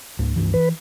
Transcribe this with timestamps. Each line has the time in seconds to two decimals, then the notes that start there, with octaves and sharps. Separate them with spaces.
0.19 C#2 G#2
0.36 C#2 G2 E3
0.54 E3 B4